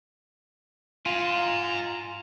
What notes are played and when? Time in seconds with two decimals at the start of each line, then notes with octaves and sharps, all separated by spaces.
1.06 F4 G#5 A#5